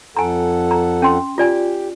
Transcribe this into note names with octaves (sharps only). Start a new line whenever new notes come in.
F2 A4 F#5 G#5 A#5
A#5
C#4 G5 C6
F4 G4 D5 G#5